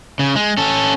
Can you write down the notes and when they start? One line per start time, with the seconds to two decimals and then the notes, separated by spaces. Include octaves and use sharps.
0.19 C#3
0.36 G#3
0.57 C#4 A4